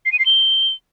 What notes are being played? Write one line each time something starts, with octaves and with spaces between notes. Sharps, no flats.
C7
D#7
C7
G7